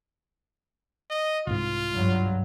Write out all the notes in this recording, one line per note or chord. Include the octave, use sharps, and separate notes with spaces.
D#5
C2 G#2 F4
G2 F#3